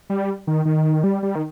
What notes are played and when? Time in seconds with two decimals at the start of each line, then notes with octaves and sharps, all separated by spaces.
0.10 G3
0.47 D#3
0.65 D#3
1.04 G3
1.23 G3
1.35 D#3